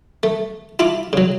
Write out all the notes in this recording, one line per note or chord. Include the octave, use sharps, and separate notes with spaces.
A3
E4 F4 A5 D6
C#3 F#3